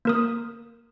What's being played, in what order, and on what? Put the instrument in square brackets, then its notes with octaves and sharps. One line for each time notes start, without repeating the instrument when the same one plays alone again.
[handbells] A#3 A#4 D#6